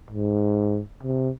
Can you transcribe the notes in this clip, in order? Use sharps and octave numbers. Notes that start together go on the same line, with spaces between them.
G#2
C3